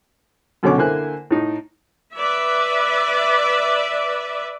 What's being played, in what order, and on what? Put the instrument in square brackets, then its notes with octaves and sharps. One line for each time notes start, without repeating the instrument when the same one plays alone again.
[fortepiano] F#2 B2 D3 C#4 C#5 D6
D3 A#3 E4 C5 G#5 F#6
A2 D#4
[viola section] B4 D5 E5